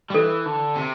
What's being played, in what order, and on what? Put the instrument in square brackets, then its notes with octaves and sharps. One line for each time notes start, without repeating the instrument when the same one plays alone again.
[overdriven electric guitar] G3
[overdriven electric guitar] E3 [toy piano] A4
[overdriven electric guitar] D3
C3